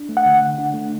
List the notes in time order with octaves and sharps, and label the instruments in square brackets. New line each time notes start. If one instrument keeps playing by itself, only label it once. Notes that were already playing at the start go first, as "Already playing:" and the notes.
Already playing: [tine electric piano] D4
A3
[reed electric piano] F#5
[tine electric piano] D3
D3
D4
A3